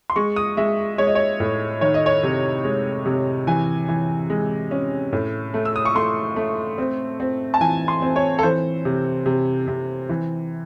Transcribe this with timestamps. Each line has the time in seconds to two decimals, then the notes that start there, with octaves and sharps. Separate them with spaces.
0.10 C6
0.16 G#3 C#6
0.36 D#6
0.57 G#3 E5
0.98 G#3 C#5
1.07 D#5
1.15 C#5
1.40 A2
1.81 D#3 C#5
1.94 D#5
2.06 C#5
2.23 C3
2.64 G#3
3.06 C3
3.47 E3 G#5
3.89 E3
4.30 G#3
4.71 C#4
5.13 A2
5.54 A3
5.65 E6
5.76 D#6
5.85 C#6
5.95 A3 C6
6.36 A3
6.78 C4
7.20 C4
7.54 A5
7.61 E3 G#5
7.88 C6
8.02 C4
8.16 C#5
8.39 A4
8.43 E3 C5
8.85 C3
9.26 C3
9.68 C3
10.09 E3